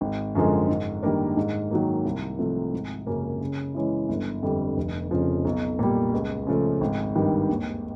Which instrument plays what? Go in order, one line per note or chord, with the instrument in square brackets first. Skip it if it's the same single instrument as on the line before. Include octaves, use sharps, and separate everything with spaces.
[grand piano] G#1
F#2 D3 F3 G#3
G#2
D#3 G3 A#3 D4
G#2
D#3 F#3 A#3
C2
C3 F3 A3
G#1
F#2 C#3 F#3 A#3
C#3
E3 G#3 C#4 E4
G1
F2 D3 G3
F1
F2 C#3 F3
B1
A#2 G3
C#2
C#3 F3 A3
G#1
G2 D#3 G3
D#2